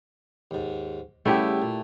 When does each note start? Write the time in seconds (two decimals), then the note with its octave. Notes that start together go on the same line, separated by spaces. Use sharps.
0.51 D#2 G#2
1.26 C#3 G3 A3 B3 E4 G4
1.62 A#2